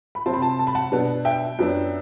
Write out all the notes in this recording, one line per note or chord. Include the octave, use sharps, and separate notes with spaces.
B5
C3 F#3 C4 A5 C6
B5
A5 C6
A5
B5
F#5 A5
B2 F#3 B3 D4
E5 G5
F#2 F#3 B3 D4